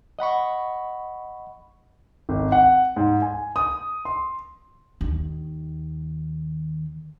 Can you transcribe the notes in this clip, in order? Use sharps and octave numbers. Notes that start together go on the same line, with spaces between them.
D#5 F#5 B5 C#6
G#1
F#5
G#2
G#5
D#6
C6
D#2 D#3